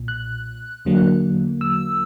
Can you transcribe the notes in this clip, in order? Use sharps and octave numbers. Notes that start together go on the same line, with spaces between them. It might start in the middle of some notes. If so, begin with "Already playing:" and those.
Already playing: B1 A#2
F#6
E2 D3 F#3 A#3
E6